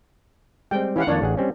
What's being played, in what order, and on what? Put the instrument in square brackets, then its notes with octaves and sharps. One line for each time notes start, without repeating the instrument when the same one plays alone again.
[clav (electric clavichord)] G3 C4 [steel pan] G#3 G5
[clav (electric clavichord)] E3 C#4 G4 [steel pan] E4 F5 F#5
[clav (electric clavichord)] F2 D#3 A#3 [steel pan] D4 C#5
[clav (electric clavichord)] A1 G#4 F#5
G3 C4 C#4